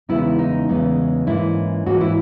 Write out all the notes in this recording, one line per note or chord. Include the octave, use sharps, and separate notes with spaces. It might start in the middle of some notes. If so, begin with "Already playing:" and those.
E2 C#3 G#3 B3 D#4 E4
D#4
E2 C#3 G#3 B3 D#4
G#2 E3 A#3 C#4 E4
G#2 E3 A#3 C#4 F#4
E4